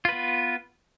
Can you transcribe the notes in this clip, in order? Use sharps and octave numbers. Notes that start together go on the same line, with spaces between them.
B3 F4 B4